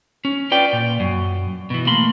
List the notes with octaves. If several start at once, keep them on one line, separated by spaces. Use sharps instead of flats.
C#4
F4 B4 D5 G5
A#2
F#2
B2 E3
A3 A#3 B5 C6